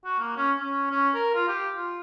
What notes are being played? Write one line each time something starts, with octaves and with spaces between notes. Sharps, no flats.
F#4
A#3
C#4
C#4
C#4
A#4
F4
G4
F4